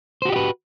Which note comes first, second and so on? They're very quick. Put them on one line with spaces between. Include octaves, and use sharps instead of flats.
C5 F#4 G4 D#5 B4